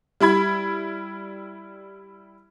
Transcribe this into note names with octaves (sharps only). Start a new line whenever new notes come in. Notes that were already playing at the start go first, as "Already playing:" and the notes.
G3 E4 B5 G#6